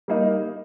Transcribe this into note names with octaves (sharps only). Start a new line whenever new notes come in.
G3 A#3 D#4